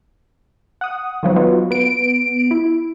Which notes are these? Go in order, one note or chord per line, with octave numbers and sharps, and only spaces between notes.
F#5 D#6
D#3 F3 F#3 B3
F#3 B3 D#4 F4 F#4
B3 D7
E4